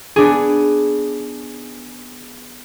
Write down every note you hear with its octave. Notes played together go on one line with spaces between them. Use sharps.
B3 D4 G#4